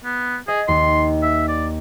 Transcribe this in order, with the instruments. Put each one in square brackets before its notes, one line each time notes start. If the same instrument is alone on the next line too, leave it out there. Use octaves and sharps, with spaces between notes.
[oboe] B3
[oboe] G#4 [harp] D#5
[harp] D#2 [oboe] C6
[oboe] E5
D5